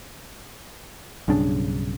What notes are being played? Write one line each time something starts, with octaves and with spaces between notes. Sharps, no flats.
B1 G2 C#3 D4